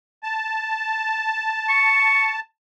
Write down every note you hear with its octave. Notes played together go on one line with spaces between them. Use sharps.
A5
C#6